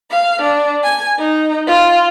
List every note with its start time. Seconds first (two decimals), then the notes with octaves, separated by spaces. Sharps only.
0.11 F5
0.43 D4
0.83 G#5
1.18 D#4
1.66 F4